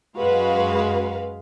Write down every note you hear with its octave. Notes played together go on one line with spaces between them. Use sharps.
F#2 G#3 F#4 B4 F5